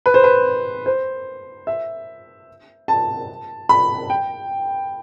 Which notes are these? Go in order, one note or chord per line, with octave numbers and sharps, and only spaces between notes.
B4
C5
B4
C5
E5
A5
B5
G5